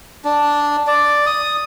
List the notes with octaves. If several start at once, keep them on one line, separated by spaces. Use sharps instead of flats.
D4
D5
D#6